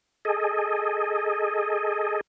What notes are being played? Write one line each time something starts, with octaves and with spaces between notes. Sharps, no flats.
G#4 A4 D#5